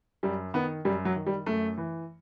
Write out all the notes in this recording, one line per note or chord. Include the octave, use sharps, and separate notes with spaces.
F#2 G3
D#3 B3
F#2 G3
F#3
D#3
G3
F#2 A3
E3